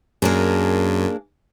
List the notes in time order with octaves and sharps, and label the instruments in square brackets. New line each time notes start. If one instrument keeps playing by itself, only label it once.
[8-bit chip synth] F#2 [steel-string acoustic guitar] A#3 D4 G#4